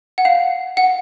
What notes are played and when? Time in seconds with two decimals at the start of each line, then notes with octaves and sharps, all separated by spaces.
0.18 F#5
0.25 F5
0.77 F#5